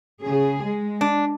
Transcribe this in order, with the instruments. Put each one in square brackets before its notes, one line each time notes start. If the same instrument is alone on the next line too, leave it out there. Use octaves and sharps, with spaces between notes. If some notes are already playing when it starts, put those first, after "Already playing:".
[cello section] C#3 G#4
G#3
[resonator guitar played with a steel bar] D4